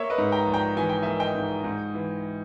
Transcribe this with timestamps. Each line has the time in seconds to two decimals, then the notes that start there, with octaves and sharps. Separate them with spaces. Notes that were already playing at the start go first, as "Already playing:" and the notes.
Already playing: A#3 C#5 E5
0.10 B4 D#5
0.18 G#2
0.32 G5 A#5
0.46 A#1
0.54 G5 A#5
0.77 E3 G#5
0.89 G5
1.02 A#3 E5 G#5
1.20 D#5 G5
1.35 G#2
1.64 G#2
1.94 E3